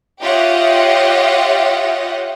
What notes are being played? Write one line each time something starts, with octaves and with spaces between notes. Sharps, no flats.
F4 G4 C#5 D#5 E5 F#5